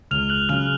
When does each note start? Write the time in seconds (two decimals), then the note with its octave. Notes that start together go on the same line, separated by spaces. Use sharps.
0.11 C#2 F6 F7
0.29 F#6 F#7
0.49 C#3 F#3 F6 F7